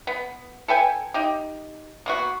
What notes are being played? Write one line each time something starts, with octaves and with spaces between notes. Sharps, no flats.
B3
A4 B4 G5 G#5
D#4 G4
A#3 B3 F#4